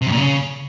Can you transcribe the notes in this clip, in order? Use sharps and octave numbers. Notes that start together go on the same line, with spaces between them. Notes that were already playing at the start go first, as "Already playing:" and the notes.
C3
F#2
A#2
C#3